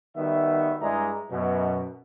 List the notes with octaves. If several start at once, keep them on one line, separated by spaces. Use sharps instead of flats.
D#3 G3 B3 F#4 E5
G2 G#3 E4 D5 D#5 A#5
F#2 B2